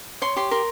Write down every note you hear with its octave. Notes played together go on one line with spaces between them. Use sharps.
C#5 C6
G4 C6
A#4 C6